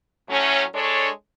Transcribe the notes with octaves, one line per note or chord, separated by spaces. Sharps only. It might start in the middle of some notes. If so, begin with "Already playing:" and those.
A2 F#3 A3 C#4
G#3 D4 A4 C#5